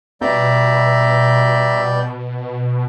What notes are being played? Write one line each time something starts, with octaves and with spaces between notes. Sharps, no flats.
B2 G3 D5 E5 A#5 G6